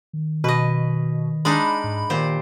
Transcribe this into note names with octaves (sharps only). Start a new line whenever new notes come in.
D#3
B2 B4 D#5
G#3 D4 D#4 B5
G#2
A#2 D#3 G4 C5